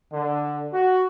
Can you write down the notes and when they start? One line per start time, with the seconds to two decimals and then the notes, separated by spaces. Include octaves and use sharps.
0.13 D3
0.73 F#4